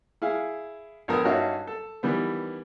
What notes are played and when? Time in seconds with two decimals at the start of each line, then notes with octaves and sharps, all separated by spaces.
0.22 E4 G#4 F5
1.08 A#1 B3 A4 A#4 D#6
1.25 G2 C#4 D#4 F#4 E5 F5
1.67 A4
2.03 D#3 E3 G3 B3